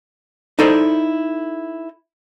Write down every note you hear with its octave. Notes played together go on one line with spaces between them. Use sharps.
D#4 E4 A4 C5 D5